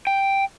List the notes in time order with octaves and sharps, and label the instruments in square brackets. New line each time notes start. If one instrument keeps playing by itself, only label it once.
[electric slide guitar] G5